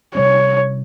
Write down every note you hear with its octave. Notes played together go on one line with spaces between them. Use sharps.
C3 G3 C#4 C#5